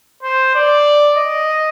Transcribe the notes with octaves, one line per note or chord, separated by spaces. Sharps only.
C5
D5
D#5